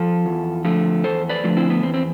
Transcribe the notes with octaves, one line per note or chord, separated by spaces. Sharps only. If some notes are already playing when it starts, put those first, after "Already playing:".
Already playing: F3 F4 A4
E2
D3 F3 A3
E2 A4 C5
B4 D5
D3 F3 A3 F4
C4 E4
B3
E2 C4
C4